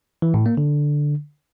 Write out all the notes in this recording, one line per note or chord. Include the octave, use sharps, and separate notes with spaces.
E3
A2
A#3
D3